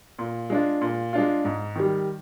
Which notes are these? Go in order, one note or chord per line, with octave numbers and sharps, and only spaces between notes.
A#2
G#3 D4 F4
A#2
G#3 D4 F4
G#2
D#3 G3